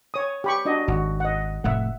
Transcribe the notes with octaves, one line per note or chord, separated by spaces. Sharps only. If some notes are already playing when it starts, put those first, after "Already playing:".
C#5 D#6
G4 B5 C#6
D4 F#4 D#5
G#1 F#4
D#5 F#5
F1 A2 A3 E5 F#5